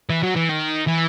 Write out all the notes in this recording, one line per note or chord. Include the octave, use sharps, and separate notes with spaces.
E3
F#3
E3
D#3
E3